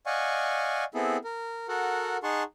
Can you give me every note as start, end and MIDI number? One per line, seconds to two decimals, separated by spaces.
0.06 0.84 74
0.06 0.84 75
0.06 0.84 77
0.06 0.84 78
0.06 0.84 80
0.06 0.84 85
0.95 1.17 59
0.95 1.17 60
0.95 1.17 64
0.95 1.17 68
0.95 1.17 69
1.24 1.67 70
1.68 2.17 66
1.68 2.17 69
1.68 2.17 70
1.68 2.17 78
2.23 2.43 63
2.23 2.43 68
2.23 2.43 78
2.23 2.43 81
2.23 2.43 84
2.23 2.43 85